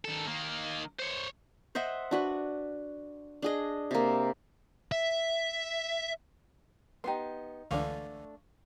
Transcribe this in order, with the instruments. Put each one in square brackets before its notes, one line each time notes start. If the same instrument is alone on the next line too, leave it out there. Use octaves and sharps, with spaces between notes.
[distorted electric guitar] D#3 A4
D#3 A#3
C5 C#5
[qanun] C5 D#5 E5 F#5
D4 F#4 B4
D4 G#4 D#5
C3 A#3
[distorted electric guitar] E5
[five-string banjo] B3 G4 [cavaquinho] D#4 G#4 C6
[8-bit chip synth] C#2 D3 E3 [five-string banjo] A3 D4 [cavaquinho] F5 C#6 D6